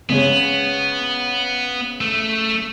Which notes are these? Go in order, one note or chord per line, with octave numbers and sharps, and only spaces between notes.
C#3 G#3 B3 C#5
A3